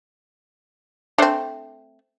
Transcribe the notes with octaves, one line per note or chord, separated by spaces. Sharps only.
A3 C4 D4 C5